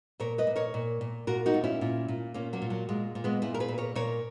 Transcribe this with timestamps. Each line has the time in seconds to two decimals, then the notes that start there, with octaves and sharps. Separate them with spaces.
0.20 A#2 A#4 C#5
0.38 B4 D#5
0.47 A#2
0.56 A#4 C#5
0.74 A#2
1.01 A#2
1.27 A#2 F#4 A#4
1.46 D#4 F#4
1.54 A#2
1.64 C#4 E4
1.81 A#2
2.08 A#2
2.34 A#2 A#3 C#4
2.53 F#3 A#3
2.62 A#2
2.70 F#3
2.89 A#2 G#3
3.15 A#2
3.24 G#3 B3
3.42 A#2 E4 G#4
3.54 A#4
3.60 G#4 B4
3.68 A#2
3.78 A#4 C#5
3.95 A#2 A#4 C#5